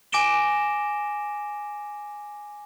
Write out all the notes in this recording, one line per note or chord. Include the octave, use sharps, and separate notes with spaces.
G#5 D6 A#6 D7 E7 G7